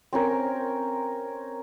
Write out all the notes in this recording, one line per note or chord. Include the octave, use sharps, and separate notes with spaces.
C4 C#4 A#4